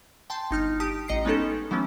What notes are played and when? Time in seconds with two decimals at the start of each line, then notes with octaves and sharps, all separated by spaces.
0.30 G5 A5 C6
0.51 G1 D#4 F6
0.80 G4 A5 D#6 D7
1.08 A1 D#5 A#5 C7 C#7
1.25 G#3 B3 C#4 D#4 G4 A4
1.71 E3 F#3 A3 B3 C#4